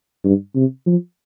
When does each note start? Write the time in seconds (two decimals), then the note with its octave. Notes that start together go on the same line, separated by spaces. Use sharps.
0.25 G2
0.56 C3
0.86 F3